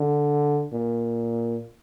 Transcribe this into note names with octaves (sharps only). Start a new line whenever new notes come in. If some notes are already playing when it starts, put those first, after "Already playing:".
Already playing: D3
A#2